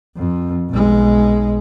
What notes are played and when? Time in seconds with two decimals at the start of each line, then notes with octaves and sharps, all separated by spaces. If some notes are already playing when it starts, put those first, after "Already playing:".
0.17 F2
0.70 B1 G#3